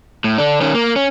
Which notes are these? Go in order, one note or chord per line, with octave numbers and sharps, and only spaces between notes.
A2
D3 D4
D#3 C#4
A#3
C#4